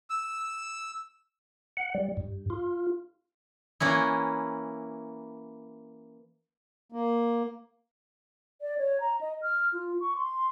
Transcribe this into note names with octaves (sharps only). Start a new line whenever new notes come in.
E6
F#5
G3
G2
F4
E3 A#3 C#4 E4
A#3
D5
C#5
A#5
D#5
F6
F4
C#6
C6